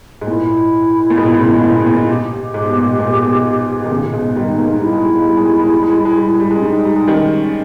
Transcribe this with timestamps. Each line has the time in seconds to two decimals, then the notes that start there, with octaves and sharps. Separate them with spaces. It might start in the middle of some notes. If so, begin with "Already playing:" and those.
0.21 G#2
0.27 A#2 E4
1.10 A#2
1.17 G#2 B2
1.40 A#2 C#3
1.63 A#2
1.78 B2
1.86 A#2
1.99 E4
2.09 G4
2.54 G#2
2.66 B2
2.77 A#2
2.99 A#2
3.13 B2
3.26 A#2
3.85 D#3
3.91 A#2 C#3
4.13 G#2 B2
4.36 D#3 G3 D#4
4.58 G3 A#3
4.71 D#4
4.81 G3 E4
4.93 G#3
5.04 G3
5.15 G#3
5.26 G3
5.37 G#3
5.49 G3
5.60 G#3
5.72 G3
5.83 G#3
5.94 G3
6.05 G#3
6.16 G3
6.28 G#3
6.40 G3
6.51 G#3
6.56 C#4
6.62 G3 D#4
6.73 G#3
6.85 G3
6.96 G#3
7.07 D#3 G3 C#4